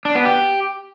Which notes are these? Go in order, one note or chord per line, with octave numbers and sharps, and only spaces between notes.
D4
B3
G4